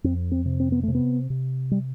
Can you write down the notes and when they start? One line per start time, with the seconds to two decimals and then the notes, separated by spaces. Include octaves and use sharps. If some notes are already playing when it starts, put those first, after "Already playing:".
0.04 F2 C4
0.32 C4
0.45 C3
0.60 C4
0.72 B3
0.83 C3 A3
0.95 B3
1.30 C3
1.71 G3